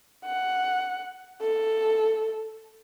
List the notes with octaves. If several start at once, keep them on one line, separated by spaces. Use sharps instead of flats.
F#5
A4